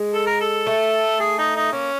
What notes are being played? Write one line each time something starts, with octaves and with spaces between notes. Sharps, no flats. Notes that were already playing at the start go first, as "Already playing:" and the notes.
Already playing: G#3
A4
A#4
A4
A3
G#4
D#4
D#4
A#3 C#4